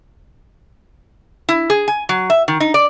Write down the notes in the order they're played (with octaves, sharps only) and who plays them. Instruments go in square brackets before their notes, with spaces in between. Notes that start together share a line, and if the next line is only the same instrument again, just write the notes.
[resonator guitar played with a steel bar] E4
G#4
G#5
F#3
E5
D#3
D#4
D5